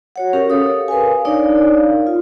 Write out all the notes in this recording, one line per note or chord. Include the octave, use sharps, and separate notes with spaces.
F#4 C#5 F#5
C#4 G4 A#4
G4 A4 C#5 F5 D#6
A#4 B4 F5 G#5
D4 D#4 A#4 C#5 D5 F5
F4